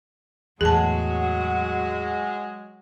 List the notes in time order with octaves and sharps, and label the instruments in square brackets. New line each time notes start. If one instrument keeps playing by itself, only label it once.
[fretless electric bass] E2 A2 [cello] F#3 F#4 [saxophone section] G#3 [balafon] G#4 A5